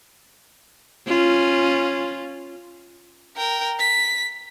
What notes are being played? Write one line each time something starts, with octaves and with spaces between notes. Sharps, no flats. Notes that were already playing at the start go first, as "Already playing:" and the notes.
C#4 F4
A#4 G5
B6